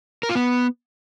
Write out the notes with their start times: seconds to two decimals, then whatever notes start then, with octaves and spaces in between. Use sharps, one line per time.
0.23 A#4
0.29 F4
0.35 B3